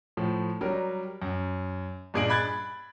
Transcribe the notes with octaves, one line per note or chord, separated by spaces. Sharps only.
A2 F3
F#3 G3 A#4
F#2
G2 A#2 G#4 D#5 D7 F#7
B5 F#6 G#6 A6